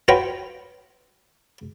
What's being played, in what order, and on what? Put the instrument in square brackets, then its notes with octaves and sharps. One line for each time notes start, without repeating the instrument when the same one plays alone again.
[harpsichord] F4 F#4 B4 C#5 G5 A#5